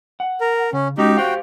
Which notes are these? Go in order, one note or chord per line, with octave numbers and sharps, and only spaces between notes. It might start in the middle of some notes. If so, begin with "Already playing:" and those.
F#5
A#4
C#3 C#4
G#3 C#4 D#4 F#4 G4
F#4 G4 C5 F5 G5